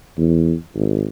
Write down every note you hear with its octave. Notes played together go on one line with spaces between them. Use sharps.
E2
G#1